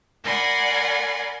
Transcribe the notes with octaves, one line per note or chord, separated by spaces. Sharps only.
A#4 D5 F#5 G#5 B5 C6